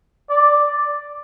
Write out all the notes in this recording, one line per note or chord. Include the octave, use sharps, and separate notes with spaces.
D5